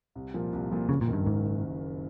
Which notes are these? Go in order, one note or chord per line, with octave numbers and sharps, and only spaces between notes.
C2
A#2 F3 A#3
C2
A#2 F3 A#3
F#1 C#3
A#2
F#2 D#3
G2
F#1 G#2